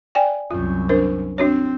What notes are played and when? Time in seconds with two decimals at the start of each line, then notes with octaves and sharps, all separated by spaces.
0.15 D5 G5 G#5
0.51 C2 F#2 F4
0.89 D4 A#4 C5
1.38 C4 D4 F#4 C#5